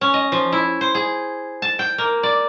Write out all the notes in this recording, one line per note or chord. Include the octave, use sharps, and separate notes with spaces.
C#4
D#5
F3
E4
C5
G#4
A5
G5
A#3
D5